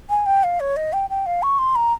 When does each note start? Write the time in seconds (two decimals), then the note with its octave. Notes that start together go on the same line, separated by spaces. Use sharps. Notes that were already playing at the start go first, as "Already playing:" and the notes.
0.10 G#5
0.26 G5
0.44 F5
0.60 C#5
0.76 D#5
0.93 G5
1.10 G5
1.26 F5
1.43 C#6
1.59 C6
1.75 A#5